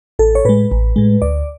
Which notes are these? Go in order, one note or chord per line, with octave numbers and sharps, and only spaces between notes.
A1 A4
C#5
A2 G#3 B4
A1
A2 G#3
D2 D5